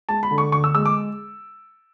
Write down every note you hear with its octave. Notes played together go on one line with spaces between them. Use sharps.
G#3 A5
B5
D3
C#6
D2 C#6
E6
G#3 E6
D6